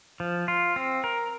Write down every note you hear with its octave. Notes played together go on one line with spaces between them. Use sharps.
F3
F4
C4
A#4